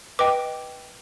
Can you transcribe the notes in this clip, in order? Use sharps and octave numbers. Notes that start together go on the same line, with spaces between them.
B4 D#5 G5 D6